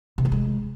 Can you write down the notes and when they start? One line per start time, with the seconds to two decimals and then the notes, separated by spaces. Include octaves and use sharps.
0.18 C3
0.25 F3
0.32 G#3